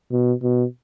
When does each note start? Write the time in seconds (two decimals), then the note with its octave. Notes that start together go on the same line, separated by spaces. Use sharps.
0.12 B2
0.43 B2